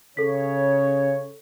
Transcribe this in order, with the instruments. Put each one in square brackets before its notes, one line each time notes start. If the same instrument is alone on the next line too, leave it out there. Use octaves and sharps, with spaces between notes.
[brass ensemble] C#3 C#5 [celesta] A4 B6